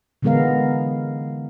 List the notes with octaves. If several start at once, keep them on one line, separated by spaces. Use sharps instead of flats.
D3 E3 G#3 B3 A#4 F5